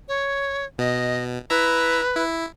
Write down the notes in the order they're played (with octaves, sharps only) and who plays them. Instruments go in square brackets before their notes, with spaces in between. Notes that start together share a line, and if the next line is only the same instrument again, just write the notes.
[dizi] C#5
[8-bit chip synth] B2 [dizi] D#5
[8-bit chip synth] E4 E5 A#5 [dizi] B4
[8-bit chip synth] E4